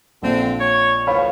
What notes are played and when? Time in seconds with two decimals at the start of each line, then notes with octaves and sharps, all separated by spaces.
0.23 A#1 D3 C4 F4
0.59 C#5
1.07 D2 E3 F3 C#5 F5 B5